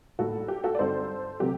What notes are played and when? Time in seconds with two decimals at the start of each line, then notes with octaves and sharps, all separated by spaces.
0.19 A2 G3 A#3 D#4 F#4 A4
0.48 G4
0.64 F#4 A4
0.75 D5
0.79 G2 D3 G3 C4 D#4 A4 C5
1.40 C3 F#3 A3 C4 G4